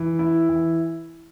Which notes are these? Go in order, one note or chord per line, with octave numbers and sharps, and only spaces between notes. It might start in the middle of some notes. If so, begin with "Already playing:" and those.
Already playing: E3
E4
E3